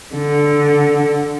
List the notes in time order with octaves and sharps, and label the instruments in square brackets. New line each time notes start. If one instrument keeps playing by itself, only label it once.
[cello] D3